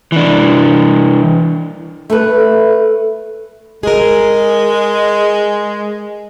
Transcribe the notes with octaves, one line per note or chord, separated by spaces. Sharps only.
E3 D4
A3 A4 B4
G#3 G#4 A#4